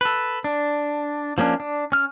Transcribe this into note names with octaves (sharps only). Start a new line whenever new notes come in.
A4 B4
D4
F3 A#3 C#4 D4
D4
C#4 F6